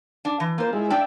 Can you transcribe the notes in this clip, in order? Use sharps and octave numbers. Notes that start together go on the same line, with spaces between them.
D4
E3
A#3 F4 C5
G#3 E4
D4 D5 E5 G5